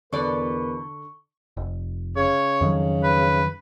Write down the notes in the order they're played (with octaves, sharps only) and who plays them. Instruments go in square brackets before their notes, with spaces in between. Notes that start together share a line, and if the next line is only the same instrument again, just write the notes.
[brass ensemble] E2 A#4 B4 [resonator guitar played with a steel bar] B2 D5 [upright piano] D3 [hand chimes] C#6
[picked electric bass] F1
[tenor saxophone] C#3 [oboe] C#5
[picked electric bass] F2 D#3 F#3
[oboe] B4